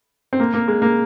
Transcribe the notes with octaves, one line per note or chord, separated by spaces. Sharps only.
C4
A#3
A#3
G#3
A#3